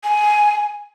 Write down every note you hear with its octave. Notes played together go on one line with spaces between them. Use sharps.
G#5